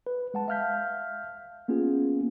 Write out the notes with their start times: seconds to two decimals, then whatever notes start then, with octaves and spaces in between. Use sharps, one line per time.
0.07 B4
0.34 G#3 F#5 A5
0.48 E5 F5 F6 G6 B6
1.68 A#3 B3 C#4 F4 G#4